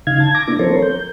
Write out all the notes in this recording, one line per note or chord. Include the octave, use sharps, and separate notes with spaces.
C#3 D#4 F5 G#6
A5 G#6
D6 A#6
A#3 B3 D4 E4
F3 C4 A4 A#4 C5 C#5
G6